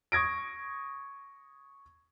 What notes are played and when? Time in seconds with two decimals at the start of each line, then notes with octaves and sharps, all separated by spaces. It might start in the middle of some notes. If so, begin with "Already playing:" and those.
0.12 C#6 D#6 G#6 A#6 D7